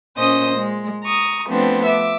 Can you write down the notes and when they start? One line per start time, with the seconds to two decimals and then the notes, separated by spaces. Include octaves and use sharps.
0.17 A#2 C#4 C5 D#5 D#6
0.56 G#3
1.04 A#5 C#6 D#6
1.46 F3 A3 B3 C4 D4
1.86 E5 D6